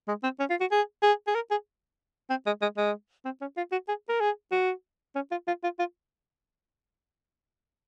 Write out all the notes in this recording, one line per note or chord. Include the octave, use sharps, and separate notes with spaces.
G#3
C4
C#4
F4
F#4
G#4
G#4
G#4
A#4
G#4
C4
G#3
G#3
G#3
C4
C#4
F4
F#4
G#4
A#4
G#4
F#4
C#4
F4
F4
F4
F4